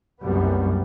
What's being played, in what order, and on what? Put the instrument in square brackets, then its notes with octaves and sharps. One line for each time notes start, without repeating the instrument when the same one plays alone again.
[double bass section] F#1 C2 F#2 G3 B3